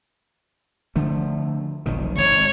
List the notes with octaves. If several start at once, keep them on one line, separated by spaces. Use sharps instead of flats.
D3 F3 A3
F1 B1 D#3
G#1 C#5